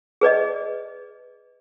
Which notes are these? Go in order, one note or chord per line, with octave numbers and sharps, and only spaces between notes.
G#4 B4 D5 D#5